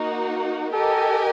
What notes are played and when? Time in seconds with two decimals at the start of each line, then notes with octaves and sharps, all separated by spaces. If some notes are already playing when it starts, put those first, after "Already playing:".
Already playing: A#3 D#4 F#4
0.73 G4 A4 A#4 D#5 G#5